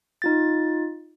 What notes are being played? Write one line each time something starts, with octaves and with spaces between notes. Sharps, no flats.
D#4 F4 A6